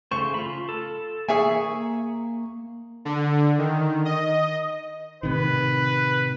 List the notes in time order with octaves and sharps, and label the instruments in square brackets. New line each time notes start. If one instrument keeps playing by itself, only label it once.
[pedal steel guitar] C#3 A3 C5 [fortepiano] C#6
[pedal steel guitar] F4 B5
A4
[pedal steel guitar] A#3 C#6 [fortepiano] G#4 E5 G#5
[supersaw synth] D3
D#3
D#5
[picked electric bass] A2 C3 D#3 [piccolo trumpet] B4